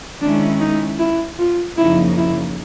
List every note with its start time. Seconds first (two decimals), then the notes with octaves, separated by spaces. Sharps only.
0.21 D#3 G#3 C#4 D4 E4
0.60 D#4
0.99 E4
1.38 F4
1.77 F#2 C#3 F3 A#3 D#4 E4
2.17 E4